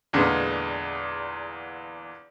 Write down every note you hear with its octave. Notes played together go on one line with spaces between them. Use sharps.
E2 A#2 D3 G#3 B3